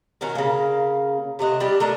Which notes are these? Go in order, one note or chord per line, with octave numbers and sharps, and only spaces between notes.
D#3 C#4 F#4 A#4
C#3 A#3
C3 A3 D#5 F#5
G3 D4 G4 D#5
A3 D4 A#4 D#5